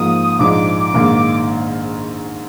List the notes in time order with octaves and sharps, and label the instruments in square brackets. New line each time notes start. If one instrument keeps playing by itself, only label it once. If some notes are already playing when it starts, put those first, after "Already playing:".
Already playing: [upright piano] G#2 F3 A#3 [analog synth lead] D#6
[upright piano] A#1 G#2 F3 G#3 D4 [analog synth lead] D6
[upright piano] A#1 G#2 D#3 A#3